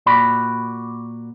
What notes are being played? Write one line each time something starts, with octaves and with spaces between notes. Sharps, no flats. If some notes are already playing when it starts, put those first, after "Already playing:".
A#2 F#4 D5 B5